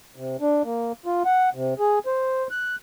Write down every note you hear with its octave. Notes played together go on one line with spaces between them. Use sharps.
C3
D4
A#3
F4
F#5
C3
G#4
C5
F#6